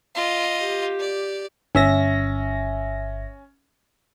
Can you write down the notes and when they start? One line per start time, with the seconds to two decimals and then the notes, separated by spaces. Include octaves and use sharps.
0.15 F4 D#5
0.62 G4
1.00 D5
1.75 G1 C#4 E5 A#6